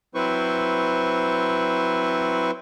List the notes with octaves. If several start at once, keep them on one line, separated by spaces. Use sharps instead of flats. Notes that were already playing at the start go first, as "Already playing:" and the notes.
F#3 C4 E4 B4 C5 C#6